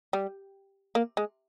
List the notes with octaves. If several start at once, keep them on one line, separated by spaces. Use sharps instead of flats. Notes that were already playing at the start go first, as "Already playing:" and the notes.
G3
A#3
G#3